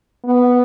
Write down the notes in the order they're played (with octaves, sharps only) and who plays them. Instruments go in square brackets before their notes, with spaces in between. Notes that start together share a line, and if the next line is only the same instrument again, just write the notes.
[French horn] B3